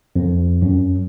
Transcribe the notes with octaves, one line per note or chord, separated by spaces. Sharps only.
F2
F#2